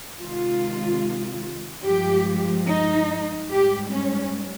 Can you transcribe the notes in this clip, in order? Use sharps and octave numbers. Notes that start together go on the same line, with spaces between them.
C3 D#3 G#3 F4
G2 F3 G#3 G4
D#4
G#2 G3 G4
C#4